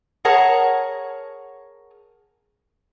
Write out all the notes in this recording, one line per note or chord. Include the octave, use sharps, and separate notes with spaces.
G#4 A#4 C#5 F#5 A5